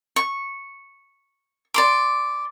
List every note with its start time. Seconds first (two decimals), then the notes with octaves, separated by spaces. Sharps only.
0.16 C#6
1.74 D5 C6 D6